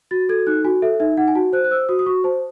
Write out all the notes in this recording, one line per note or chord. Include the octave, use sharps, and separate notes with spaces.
F#4 A6
A4 G#6
D#4 F#6
F#4 G#5
A4 E5
D#4 E5
D#4 F#5
G#5
F#4 A5
C5 F#6
F#6
C5 E6
F#4 D#6
D#6
F#4 C#6
C5 A5